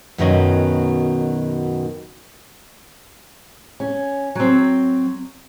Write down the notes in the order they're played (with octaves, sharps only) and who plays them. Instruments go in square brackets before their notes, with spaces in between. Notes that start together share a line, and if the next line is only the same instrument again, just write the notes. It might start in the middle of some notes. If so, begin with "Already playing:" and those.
[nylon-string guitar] F#2 B2 D#3 F#3 C#4 D#5
[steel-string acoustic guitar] C#4
F#3 C4